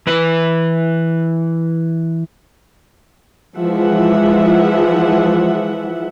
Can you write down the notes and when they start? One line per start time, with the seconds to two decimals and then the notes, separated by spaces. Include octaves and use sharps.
0.07 E3 B4
3.57 E3 F3 G#3 E5 F#5